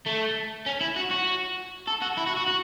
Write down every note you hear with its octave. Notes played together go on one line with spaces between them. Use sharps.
A3
C#4
E4
F#4
F#4
A4
F#4
E4
F#4
F#4
F#4